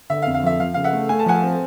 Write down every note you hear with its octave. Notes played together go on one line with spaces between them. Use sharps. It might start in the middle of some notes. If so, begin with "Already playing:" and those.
D3 E5
F5
F2
F5
F3 E5
F3 F5
C#3 F5
E5 F#5
A3
A3 G#5
A5
F3 F#5 G#5
C4